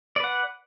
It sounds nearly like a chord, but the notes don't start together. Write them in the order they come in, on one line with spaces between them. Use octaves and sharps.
D5 B4 F#5